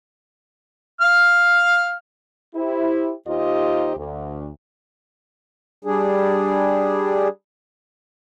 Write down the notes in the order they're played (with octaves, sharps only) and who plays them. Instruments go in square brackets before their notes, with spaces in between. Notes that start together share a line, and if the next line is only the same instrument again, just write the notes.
[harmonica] F5 F6
[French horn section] E4 G4 C5
D#2 D#4 F4 G4 C5 D#5
D2
[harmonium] G3 D4 G#4